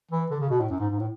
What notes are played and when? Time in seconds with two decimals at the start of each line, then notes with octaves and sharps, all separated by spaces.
0.11 E3
0.31 D3
0.41 C#3
0.50 B2
0.60 A2
0.70 F#2
0.80 G#2
0.90 G#2
0.99 A2